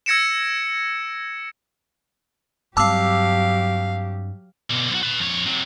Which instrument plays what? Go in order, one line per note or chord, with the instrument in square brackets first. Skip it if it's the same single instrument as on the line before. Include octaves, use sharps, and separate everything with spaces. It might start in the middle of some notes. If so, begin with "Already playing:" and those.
[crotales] E6 G#6 A#6 C#7 D7 E7
[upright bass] G2 C4 [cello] F#3 G4 [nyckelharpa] F5 [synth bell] A5 D6 E6
[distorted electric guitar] B2 D3
B1 F#4
B4 A5
F2 C#5
C3 F#3